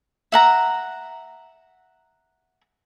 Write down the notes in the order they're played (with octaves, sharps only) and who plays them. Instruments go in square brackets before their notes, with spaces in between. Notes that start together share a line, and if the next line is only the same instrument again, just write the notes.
[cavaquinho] E5 F#5 A#5